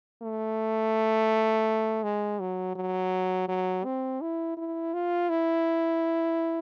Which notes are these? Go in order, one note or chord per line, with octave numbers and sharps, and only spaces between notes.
A3
G#3
F#3
F#3
F#3
C4
E4
E4
F4
E4